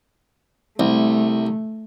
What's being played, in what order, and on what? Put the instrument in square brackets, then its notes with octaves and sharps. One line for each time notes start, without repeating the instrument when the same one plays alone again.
[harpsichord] C2 [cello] A3